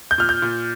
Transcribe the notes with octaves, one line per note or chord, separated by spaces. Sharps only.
G6
A#2 F6
G6
A#2